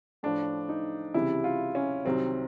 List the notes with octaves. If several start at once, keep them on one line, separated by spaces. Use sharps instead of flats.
A2 F3 D4
D#4
C#2 C3 E3 G3 E4
F4
C#4
C2 C3 D#3 F#3 C4